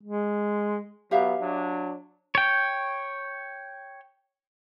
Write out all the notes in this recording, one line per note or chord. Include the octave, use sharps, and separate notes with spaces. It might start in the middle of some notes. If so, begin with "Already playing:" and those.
G#3
F#3 B3 G4 E5 F5
F#3 D4
C#5 G5